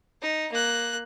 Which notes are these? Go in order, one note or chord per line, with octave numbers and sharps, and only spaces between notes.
D#4
A#3 F#6